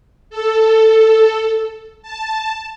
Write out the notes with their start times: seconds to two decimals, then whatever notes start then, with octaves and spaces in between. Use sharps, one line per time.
0.30 A4
2.02 A5